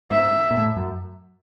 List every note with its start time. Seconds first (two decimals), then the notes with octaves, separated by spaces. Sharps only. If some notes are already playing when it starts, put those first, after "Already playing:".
0.11 G#2 E5
0.51 A#2
0.57 A2
0.77 F#2